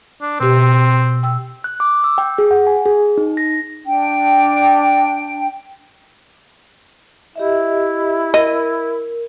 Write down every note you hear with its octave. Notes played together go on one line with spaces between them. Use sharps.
D4
B2 C4 G4
G5 E6
F#6
D6
E6
G5
G#4
F#5
G#5
G#4
D#4
A#6
D4 G5
E4 G4 D#5 E5
A#4 D#5